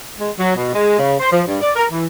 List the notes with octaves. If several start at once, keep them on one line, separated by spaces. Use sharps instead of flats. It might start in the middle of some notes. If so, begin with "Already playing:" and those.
G#3
F#3
B2
G#3
C#3
C5
F3
G2
D5
A#4
E3